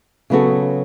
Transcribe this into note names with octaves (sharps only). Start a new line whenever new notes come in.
C#3 F#3 B3 F#4 A4